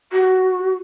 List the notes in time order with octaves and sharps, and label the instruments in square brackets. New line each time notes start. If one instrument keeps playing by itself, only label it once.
[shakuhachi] F#4